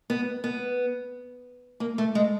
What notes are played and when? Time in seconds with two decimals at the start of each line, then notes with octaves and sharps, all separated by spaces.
0.10 B3
0.44 B3
1.80 A#3
1.98 A3
2.15 G#3